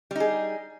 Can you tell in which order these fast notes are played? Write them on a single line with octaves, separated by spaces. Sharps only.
G3 D#4 G#4